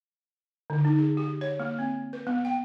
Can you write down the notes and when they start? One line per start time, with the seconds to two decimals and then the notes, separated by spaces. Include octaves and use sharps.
0.70 D3
0.85 D#4
0.99 G#4
1.17 G4
1.41 C#5
1.60 A#3
1.79 C4
2.13 B4
2.27 B3
2.45 G5